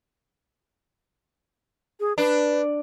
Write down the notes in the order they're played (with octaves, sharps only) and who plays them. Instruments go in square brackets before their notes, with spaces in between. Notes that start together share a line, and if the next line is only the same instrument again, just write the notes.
[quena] G#4
[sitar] D4 [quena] B4